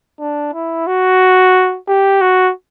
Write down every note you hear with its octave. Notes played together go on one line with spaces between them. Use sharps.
D4
E4
F#4
G4
F#4